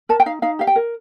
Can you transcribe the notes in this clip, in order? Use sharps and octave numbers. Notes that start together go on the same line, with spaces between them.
A#4 A5
G5
D#4 F5
D#4 F5
G4 F5
G5
A#4